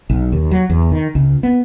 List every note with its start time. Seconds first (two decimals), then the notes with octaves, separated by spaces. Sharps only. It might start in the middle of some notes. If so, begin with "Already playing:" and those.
0.10 B1
0.32 D#2
0.51 F#3
0.70 E2
0.92 D#3
1.15 C#2
1.43 B3